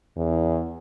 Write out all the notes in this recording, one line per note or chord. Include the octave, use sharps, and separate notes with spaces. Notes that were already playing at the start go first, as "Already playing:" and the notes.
E2